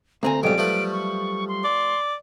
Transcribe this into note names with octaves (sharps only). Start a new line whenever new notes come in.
D2 A#3 C4 G#5 A#5
B1 F2 G#2 F#3 G3 D7
F3 A3 B4
C#6
C6
D5